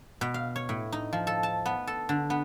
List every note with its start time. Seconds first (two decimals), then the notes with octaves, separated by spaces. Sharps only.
0.21 B2
0.34 F5
0.56 C#5
0.69 A2
0.92 D#4
1.13 F3
1.27 A4
1.43 A5
1.66 B3
1.87 A4
2.09 D3
2.30 B3